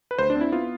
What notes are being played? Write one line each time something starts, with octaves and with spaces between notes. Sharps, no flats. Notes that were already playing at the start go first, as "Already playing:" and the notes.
B4
D2 C5
D4
C4
E4
B3 F4